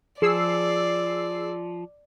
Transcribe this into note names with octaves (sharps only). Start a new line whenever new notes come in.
F3 G#4 D5 E6 C7